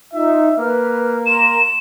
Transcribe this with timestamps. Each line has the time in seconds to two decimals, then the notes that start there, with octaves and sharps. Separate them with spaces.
0.13 D#4 F4 E5
0.57 A#3 B4 F6
1.26 A#4 A#5 C6 E7